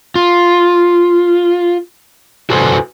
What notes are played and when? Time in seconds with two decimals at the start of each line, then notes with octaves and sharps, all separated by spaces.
0.15 F4
2.50 F#4 A4 B4 C5 G#5